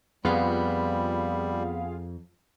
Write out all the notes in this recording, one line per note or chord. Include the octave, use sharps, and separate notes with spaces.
F2 G3 B3 F4 G#4 F5